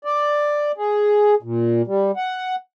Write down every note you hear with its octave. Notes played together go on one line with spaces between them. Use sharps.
D5
G#4
A#2
G3
F#5